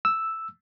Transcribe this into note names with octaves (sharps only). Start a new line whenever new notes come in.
E6